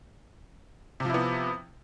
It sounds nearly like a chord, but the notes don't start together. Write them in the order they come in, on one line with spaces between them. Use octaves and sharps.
C3 F3 E4 B3